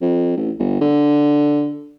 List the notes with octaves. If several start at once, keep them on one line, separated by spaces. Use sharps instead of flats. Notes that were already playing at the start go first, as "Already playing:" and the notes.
F2
A1
G1
D3